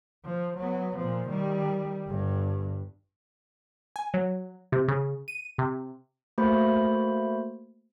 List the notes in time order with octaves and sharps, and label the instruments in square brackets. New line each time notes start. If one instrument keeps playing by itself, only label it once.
[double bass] F3
F#3 B3
A#2 F3
D#3 G3
G1 G2
[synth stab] G#5
F#3
C3
C#3
D#7
C3
[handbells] A3 A#3 F#4 C5 B5